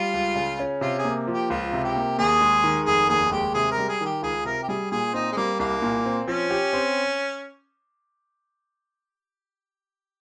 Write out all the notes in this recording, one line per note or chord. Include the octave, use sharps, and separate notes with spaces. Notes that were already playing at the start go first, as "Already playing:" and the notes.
Already playing: G3 F4
C#2
C#3
C#4
C3 F4
G#4
A#3
F3
G4
C#2 F4
C3
G4
A#3
D#2 G#4
G#3
D#3
F1 G#4
D#2 G#4
G#3 G4
C3 G#4
A#4
G3
G#4
D#3
G4
C#2 G#4
C3 A#4
G4
G3 G#4
A#2 G#4
C4 D#4
G#3
G3 A#3
C2 A#3
A#2
C4
F3 C#4
G4
C4